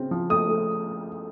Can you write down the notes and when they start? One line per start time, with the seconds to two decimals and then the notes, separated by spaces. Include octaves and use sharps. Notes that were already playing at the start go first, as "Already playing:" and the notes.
Already playing: C#3 C4
0.11 F3
0.30 A3 D#6
0.48 A3